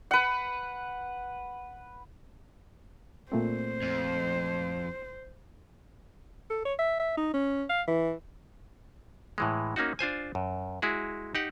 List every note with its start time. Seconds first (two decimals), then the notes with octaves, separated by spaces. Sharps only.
0.11 B4 F#5
3.32 A#2 A3 C4 C5
3.82 F2
6.50 A4
6.65 C#5
6.79 E5
7.00 E5
7.17 D#4
7.34 C#4
7.70 F5
7.88 E3
9.38 A2 E3 G#3
9.76 A#3 C#4 D#4 F#4
9.99 D4 F4 C5 G#5
10.35 F#2
10.82 G#3 E4 F#4 G#4
11.35 D#4 G4 F#5